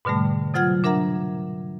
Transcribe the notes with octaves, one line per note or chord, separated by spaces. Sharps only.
G#2 B2 D3 G3 A3
C3 F#3 F4 F#5 F6 G#6
D4 A#4 E5 F#5 A#5